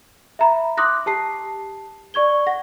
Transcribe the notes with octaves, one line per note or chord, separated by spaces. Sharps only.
E5 A#5 B5
C6 D6 D#6 F#6 A#6
G4 A5 C7
D5 C#6 G#6 G7
F#5 A#6